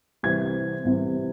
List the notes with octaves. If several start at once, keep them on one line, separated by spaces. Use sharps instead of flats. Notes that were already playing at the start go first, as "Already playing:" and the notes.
C2 C3 E3 C4 G#6
C2 C3 E3 C4